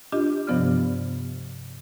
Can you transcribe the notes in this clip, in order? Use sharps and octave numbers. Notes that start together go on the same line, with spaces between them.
D4 F4 G4 D#5
G2 C3 F3 B3 D5 F6